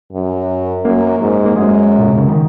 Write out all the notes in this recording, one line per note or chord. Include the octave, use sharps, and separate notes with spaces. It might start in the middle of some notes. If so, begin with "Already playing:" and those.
F#2
F#2 A#3
G#2
A#3
F#2 G#3
A#2
C3
C#3
D#3